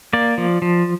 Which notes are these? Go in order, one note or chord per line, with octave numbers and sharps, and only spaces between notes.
A#3 D5
F3
F3